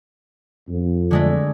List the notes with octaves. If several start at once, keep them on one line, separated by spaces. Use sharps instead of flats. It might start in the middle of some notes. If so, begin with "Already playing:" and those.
F2
D3 G#3 A3